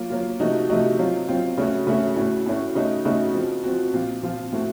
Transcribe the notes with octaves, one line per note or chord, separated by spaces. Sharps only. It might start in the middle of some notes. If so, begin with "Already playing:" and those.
Already playing: F#3 A#3 F4
F#3 A#3 F4
C3 F3 A3 D#4 F#4
C3 F3 A3 D#4 F#4
F#3 C4 F4
F#3 C4 F4
C#3 A3 C#4 F#4
C#3 A3 C#4 F#4
A2 A3 C#4 F#4
A2 A3 C#4 F#4
C#3 A3 D#4 F#4
C#3 A3 D#4 F#4
F3 C4 F#4
F3 C4 F#4
A#2 F3 C4 F4
A#2 F3 C4 F4
A2 A3 C4 F#4